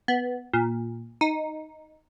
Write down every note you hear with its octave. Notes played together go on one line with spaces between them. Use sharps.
B3
A#2
D#4